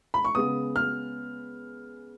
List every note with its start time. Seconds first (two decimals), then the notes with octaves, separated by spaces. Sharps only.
0.14 B5
0.25 C#6
0.35 C#3 G#3 B3 D#6
0.76 F6